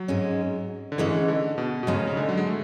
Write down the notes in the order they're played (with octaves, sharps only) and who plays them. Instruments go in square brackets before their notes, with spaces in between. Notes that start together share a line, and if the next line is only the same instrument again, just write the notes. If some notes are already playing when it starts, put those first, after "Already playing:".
Already playing: [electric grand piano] F#3
[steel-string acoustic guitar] G#2 G#3 C#4
[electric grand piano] D3
[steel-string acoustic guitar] G#2 G#3 C#4 [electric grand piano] E3
[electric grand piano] D3
B2
B2
[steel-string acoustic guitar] G#2 G#3 C#4 [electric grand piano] C#3
[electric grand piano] C#3
D3
F#3
G#3
A3